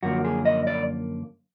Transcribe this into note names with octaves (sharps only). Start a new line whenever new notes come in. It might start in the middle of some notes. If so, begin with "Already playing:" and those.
F#2 D3 F3 A#3 F#4
G#4
D#5
D5